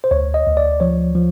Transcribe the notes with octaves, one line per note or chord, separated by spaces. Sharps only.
C5
D2 C#5
D#5
D2
D5
F3 C#5
F3